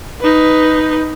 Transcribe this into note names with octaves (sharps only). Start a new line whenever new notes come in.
D#4 B4